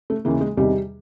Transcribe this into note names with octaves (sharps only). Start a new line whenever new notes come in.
A3
D#2 C#3 E3 A#3
G#3
E2 C3 D#3 G3